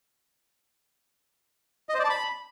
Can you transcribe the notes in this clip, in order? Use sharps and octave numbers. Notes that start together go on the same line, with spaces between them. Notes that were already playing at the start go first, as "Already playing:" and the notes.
D#5
C5
D5
A5
B5